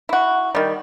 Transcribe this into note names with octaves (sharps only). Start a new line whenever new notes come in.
E4 F#4
D#3 G3